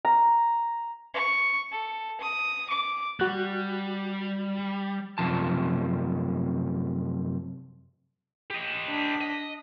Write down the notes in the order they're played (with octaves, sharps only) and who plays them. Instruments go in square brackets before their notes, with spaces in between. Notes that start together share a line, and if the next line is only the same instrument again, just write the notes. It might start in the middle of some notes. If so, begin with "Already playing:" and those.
[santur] A#5
[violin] C#6
A4
D#6
D6
[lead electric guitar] G3 [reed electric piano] F#4 F#6
[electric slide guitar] F#2 C3 F3 A5
[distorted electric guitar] G4 D#5
[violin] D4 B6
[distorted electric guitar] D#5